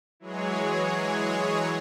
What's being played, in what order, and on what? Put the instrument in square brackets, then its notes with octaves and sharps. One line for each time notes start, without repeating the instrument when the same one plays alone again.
[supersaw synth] E3 F#3 G#3 G#4 C#5